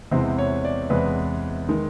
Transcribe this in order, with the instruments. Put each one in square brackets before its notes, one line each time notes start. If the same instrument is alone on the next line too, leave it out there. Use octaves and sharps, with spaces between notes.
[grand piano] E2 C3 E3 G#3 C5
C#5
D5
E2 C3 E3 G#3 B4
D#3 G#3